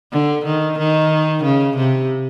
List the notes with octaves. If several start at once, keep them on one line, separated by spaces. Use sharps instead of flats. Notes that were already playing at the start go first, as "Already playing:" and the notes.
D3
D#3
D#3
C#3
C3